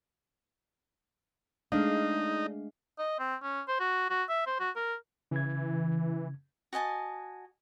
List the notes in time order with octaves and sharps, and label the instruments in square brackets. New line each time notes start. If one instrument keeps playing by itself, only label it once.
[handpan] G#3 A3 F5 [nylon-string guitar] D4 [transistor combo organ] D#4
[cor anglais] D#5
C4
C#4
C5
F#4
F#4
E5
C5
F#4
A#4
[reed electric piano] C#3 G#6 [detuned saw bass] E3
[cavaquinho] F#4 D#5 G#5 A5